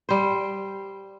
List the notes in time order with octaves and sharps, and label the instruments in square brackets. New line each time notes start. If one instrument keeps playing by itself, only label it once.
[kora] G3 C5